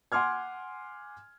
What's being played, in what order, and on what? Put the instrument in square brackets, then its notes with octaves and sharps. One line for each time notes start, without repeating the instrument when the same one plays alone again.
[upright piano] F#5 G#5 C6 D6 F6 G#6